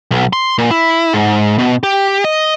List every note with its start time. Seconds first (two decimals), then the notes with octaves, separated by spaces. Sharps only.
0.11 B1
0.33 C6
0.58 A#2
0.71 E4
1.13 G#2
1.59 B2
1.83 G4
2.24 D#5